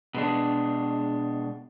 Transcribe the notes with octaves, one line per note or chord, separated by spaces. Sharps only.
B2 G#3 D4